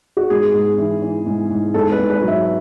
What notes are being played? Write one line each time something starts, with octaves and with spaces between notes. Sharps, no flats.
F#4
G#2 G#4
G#2
E3
E3
G#2
G#2
G#2 A4
B4
G#2
B4
F#3
E5